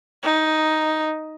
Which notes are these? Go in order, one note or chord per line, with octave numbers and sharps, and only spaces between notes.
D#4